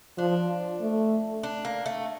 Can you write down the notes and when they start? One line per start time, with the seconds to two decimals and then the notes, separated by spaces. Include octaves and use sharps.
0.18 F3 D4
0.81 A3
1.43 D4
1.65 A#3
1.86 A3